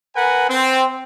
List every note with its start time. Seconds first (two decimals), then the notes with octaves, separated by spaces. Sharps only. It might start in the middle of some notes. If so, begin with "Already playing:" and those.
0.16 A#4 B4 F#5 G#5
0.49 C4